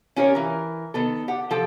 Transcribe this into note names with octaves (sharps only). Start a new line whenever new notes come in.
C#4 F4 G4 A#4 C5 C#5
E3 A#4
D#3 B3 A4
G4 F#5
F3 A4 G5